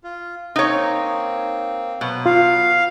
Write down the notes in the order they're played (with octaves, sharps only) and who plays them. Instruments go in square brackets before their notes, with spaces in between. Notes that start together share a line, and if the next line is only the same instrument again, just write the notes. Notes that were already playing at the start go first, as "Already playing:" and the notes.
[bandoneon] F4
[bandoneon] A#3 C4 [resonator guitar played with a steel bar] D#4 C#5
[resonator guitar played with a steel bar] B2 [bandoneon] F#3 B4
[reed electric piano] F4 [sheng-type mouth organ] F5